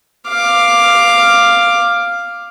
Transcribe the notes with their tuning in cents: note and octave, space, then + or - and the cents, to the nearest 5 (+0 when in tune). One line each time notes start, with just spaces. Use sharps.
F5 +0 D6 +10